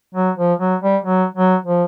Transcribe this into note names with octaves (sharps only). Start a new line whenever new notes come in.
F#3
F3
F#3
G3
F#3
F#3
F3